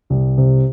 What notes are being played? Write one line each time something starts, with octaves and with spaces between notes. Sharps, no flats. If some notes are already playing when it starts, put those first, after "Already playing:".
C2
C3